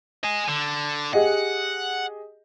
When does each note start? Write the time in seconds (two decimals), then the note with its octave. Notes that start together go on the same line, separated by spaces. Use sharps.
0.23 D#5 G#5
0.48 D3
1.14 G4 G#4 D#5 F#5